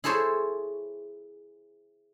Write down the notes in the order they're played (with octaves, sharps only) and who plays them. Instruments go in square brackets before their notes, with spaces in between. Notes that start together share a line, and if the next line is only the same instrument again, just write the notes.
[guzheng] E4 G#4 A4 C5 C#5